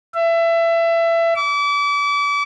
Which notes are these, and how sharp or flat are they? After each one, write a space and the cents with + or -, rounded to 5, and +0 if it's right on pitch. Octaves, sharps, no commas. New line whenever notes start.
E5 +25
D6 -35